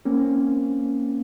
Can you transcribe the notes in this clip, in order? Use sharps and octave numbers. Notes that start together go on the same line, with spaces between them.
A#3 C4 C#4